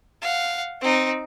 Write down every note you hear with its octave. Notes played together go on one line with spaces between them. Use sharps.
F5 F#5
C4 D#4